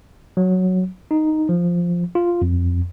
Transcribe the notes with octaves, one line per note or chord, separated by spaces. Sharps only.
F#3
D#4
F3
F4
F2